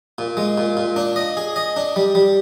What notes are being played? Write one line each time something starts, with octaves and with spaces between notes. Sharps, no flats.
A#2
G#3
A#2
A#2
D4
D#5
G#4
D#5
D4
G3
G3